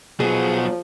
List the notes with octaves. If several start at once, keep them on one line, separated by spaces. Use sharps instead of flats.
B2 F3 F#3 G#4